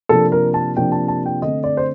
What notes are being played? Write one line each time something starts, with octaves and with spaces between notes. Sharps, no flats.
C3 F3 A#3 D4 A4
A#4
A5
C3 F3 A#3 D4 G5
A5
A5
G5
D3 A3 C4 D#5
D5
C5